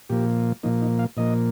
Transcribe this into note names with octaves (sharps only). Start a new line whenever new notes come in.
A#2 F3 A#3 G4
A#2 F3 A#3 D#4
D#4
F5
A#2 F3 A#3 D#5